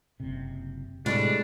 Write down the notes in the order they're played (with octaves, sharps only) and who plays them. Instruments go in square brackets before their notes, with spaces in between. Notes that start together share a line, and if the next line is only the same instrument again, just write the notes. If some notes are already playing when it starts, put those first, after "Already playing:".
[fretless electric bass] F#1 C3
[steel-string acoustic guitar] A2 G3 G4 [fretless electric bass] C3 B3 [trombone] G#3 [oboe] D4